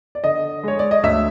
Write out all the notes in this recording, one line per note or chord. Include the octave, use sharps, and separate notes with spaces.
D5
D3 D#5
G#3 C#5
D5
D#5
D2 E5